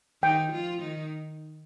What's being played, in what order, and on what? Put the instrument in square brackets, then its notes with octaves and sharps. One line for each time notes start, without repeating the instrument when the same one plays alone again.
[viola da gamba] D#3 D#4 [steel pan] G5
[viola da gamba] F3 F4
D#3 D#4